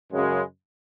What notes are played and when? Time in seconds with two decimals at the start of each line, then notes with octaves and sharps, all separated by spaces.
0.12 F#2 C#3 G#3